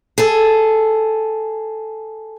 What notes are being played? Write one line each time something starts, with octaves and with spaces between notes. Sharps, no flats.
G#4 A4